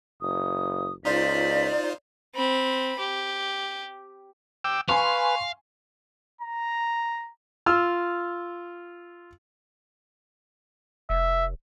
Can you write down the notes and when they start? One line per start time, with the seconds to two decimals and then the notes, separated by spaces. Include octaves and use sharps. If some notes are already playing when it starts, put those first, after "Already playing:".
0.21 F#1 D#6
1.05 C#2 D#4 F4 C5 D5 B6
2.35 C4 B5
2.99 G4
4.65 G5 D6 E6
4.89 B4 F5 G#5 C6 C#6
6.41 A#5
7.66 F4 E6 F6
11.10 F1 E5